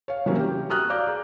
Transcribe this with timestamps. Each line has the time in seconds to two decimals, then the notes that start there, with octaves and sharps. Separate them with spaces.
0.08 C#5 F5
0.26 C3 E3 F#3 G3 A#3 C#4
0.39 G4
0.69 F#4 A#5 D#6 F6 F#6
0.90 D5 F5 A#5 D6 G6
1.07 G#4